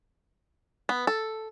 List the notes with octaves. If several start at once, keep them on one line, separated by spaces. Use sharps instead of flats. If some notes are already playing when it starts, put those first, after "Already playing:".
B3
A4